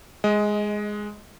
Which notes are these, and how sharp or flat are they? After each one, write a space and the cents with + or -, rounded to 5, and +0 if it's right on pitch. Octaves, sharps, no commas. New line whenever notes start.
G#3 +0 D#5 +20